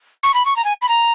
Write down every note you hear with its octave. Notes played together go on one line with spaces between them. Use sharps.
C#6
B5
C#6
A#5
G#5
B5
A#5